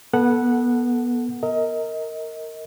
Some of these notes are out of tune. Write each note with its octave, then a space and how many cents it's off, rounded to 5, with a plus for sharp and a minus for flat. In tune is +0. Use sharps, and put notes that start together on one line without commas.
B3 -25 A4 +0 F#5 +0
A#4 -15 D#5 +25